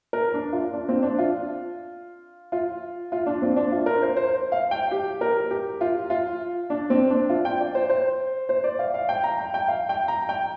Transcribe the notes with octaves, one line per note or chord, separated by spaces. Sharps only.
A#4
D4
F4
D4
C4
D4
F4
F4
F4
D4
C4
D4
F4
A#4
C5
C5
F5
G5
G4
A#4
G4
F4
F4
D4
C4
D4
F4
G5
D5
C5
C5
C5
D5
F5
F5
G5
A#5
G5
G5
F5
G5
A#5
G5